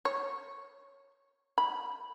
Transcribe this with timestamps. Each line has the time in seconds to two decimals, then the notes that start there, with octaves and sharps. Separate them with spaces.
0.05 C#5
1.58 B5